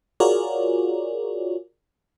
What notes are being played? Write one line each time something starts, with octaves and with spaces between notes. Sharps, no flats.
F4 F#4 G#4 A#4 C#5 D5